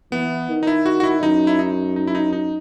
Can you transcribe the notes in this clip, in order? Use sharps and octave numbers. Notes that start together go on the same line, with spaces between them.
E3 B3
D#3
D#4
E4
F#4
F#4
E4
F#2 D#4
E4
D#4
D#4
E4
D#4
D#4